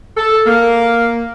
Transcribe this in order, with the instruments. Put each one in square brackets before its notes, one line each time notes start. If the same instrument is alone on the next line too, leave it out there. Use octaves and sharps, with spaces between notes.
[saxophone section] A4
A#3